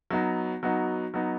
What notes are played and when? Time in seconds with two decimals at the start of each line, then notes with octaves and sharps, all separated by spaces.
0.11 F#3 B3 D#4 F#4
0.63 F#3 B3 D#4 F#4
1.14 F#3 B3 D#4 F#4